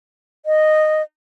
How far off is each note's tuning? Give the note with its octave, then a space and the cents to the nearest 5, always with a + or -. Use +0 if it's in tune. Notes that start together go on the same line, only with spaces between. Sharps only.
D#5 -10